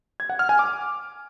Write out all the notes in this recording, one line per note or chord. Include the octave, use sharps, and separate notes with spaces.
G#6
F#5
F6
G#5
D6